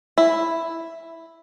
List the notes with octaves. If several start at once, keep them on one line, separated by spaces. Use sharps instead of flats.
E4